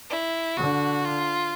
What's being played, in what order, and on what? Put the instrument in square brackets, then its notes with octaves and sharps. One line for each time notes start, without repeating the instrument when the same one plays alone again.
[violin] E4
[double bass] D3 [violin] F#4
[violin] F4